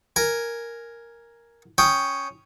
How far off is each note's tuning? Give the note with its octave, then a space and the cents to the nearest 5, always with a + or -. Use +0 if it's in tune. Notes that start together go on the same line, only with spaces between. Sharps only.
A#4 +0 G#5 +0
C#4 +0 G5 +0 D#6 +0